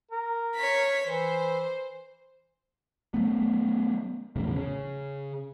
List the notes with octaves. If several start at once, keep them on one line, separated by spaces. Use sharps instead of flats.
A#4
C#5 B6
E3 C5
F#3 A3 B3
A#1 E2 A2 C#3
C#3